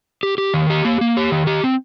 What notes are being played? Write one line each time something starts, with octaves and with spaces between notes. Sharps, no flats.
G4
G4
D#3
G4
A#3
A#3
G4
D#3
G4
C4